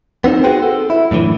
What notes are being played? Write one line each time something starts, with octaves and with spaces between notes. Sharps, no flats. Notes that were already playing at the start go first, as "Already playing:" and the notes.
B3 C4 D#4 C5
F#4 G#4 B4 C5 F#5 G5
A4
E4
F#2 A2 D3 E3